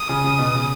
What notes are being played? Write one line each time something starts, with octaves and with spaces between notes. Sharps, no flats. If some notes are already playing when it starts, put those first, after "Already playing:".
Already playing: D#6
C#3
C#3
B2
C#3